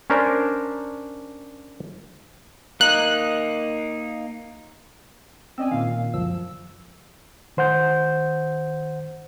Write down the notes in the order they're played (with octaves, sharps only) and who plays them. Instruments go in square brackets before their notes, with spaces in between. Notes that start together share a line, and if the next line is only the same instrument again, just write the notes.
[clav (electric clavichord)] C#4 D4 A#4 C5
[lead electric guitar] A#3 D#4 [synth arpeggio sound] F#6
[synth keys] C4 C#4 G#5 [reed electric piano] D5 D#5 E6
[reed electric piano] A#2 D#3 [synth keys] F5
[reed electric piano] C#2 F#2 F3 [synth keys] E6
[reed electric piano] D#3 C5 F#5 G6